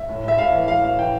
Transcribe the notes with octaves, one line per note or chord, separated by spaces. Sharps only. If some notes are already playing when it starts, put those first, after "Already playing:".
Already playing: E5
A2
A2 E5
A2 F5
E3
E3 F5
A2 F5
E3 G5